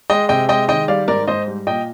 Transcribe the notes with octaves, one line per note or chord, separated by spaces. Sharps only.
G#3 D#5 G5
C3 D#5 G5
G#3 D#5 G5
D#3 D#5 G5
G3 D5 F5
G#2 A#4 D5
G#2 C5 D#5
G3
A#2 D#5 G5